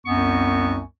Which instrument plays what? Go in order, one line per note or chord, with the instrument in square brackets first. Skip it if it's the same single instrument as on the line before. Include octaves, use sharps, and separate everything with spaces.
[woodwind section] C2 F#2 B3 C4 C#6